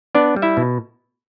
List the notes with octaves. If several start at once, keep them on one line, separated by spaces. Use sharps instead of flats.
B3 D4 D5
G3
E4 E5
B2